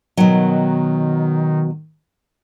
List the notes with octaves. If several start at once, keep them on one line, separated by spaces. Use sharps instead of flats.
B2 D#3 F#3